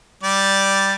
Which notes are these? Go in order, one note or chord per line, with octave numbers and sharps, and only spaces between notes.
G3 D5